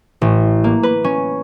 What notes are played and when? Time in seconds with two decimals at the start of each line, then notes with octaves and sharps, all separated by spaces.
0.21 A1
0.64 A#3
0.83 B4
1.04 C#4